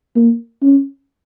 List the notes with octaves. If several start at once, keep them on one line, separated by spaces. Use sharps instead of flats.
A#3
C#4